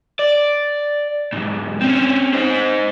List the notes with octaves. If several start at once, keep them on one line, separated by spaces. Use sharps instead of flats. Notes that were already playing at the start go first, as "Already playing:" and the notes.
D5
B1 G#2
C4 C#4
D#4 C5